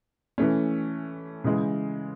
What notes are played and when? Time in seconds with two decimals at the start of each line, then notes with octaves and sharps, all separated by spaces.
0.38 E3 A3 C#4
1.44 C#3 E3 G#3